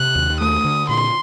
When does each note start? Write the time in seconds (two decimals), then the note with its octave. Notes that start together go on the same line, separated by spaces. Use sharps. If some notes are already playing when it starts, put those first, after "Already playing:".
Already playing: C3 F#6
0.16 D#2
0.40 A3 D#6
0.65 D3
0.89 A#2 C6